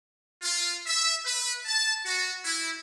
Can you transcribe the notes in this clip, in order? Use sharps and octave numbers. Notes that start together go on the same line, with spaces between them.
F4
E5
B4
A5
F#4
E4